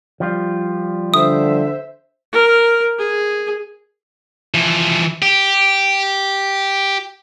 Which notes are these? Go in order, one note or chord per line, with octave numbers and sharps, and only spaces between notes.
F3 G3 F4
D3 C5 E5 D#6
A#4
G#4
E3 F3
G4